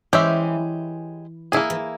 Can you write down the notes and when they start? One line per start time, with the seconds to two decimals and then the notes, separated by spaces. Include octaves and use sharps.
0.13 E3 G#3 C#4 G4 C5 E5
1.52 C#3 A#3 E4 G#4
1.70 E3